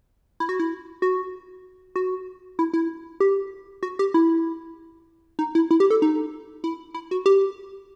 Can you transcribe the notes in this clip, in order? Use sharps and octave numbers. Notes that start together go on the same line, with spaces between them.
E4
F#4
E4
F#4
F#4
E4
E4
G4
F#4
G4
E4
D#4
E4
E4
G4
A4
D#4
E4
E4
F#4
G4